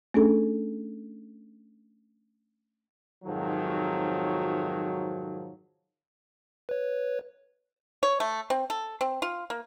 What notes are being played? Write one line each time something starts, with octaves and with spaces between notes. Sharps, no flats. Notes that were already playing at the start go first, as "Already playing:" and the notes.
A3 C#4 D4 G#4 A4
F2 G#2 C3 D#3 F3 F#3
B4 C#5
C#5
A3
C4
A4
C4
F4
A#3